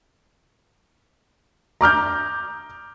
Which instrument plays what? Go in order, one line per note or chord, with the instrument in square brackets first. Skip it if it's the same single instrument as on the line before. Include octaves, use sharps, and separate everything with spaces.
[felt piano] A#5 D6 F6 G6